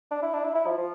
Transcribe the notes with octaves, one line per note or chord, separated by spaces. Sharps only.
D4
E4
D4
E4
E4
F3
F3